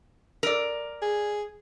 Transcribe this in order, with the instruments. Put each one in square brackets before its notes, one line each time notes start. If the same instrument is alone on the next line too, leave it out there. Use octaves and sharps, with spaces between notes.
[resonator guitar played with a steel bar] A#4 D5
[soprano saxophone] G#4